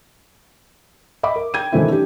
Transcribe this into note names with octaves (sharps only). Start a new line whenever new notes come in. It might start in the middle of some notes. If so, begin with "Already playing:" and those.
D#5 E5 B5 D6
A#4
G5 G#6 D#7
D#3 E3 F#3 A3 C4 E4
D4 G4